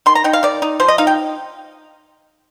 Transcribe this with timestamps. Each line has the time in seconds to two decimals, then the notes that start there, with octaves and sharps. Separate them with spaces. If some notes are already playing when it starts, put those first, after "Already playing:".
0.06 D#3 C6
0.15 A#5
0.24 D#4 G5
0.33 F5
0.43 D#3 D5
0.62 D#4
0.80 F3 C5
0.88 D#5
0.98 D#4 F5
1.07 G5